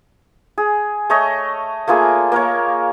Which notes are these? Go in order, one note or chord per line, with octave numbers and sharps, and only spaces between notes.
G#4
A3 C#5 D#5
A3 A#3 F4 G#4
A#3 A#4 C#5